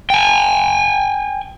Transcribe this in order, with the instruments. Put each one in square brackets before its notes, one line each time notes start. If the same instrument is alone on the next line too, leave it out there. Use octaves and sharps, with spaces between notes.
[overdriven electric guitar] G5 G#5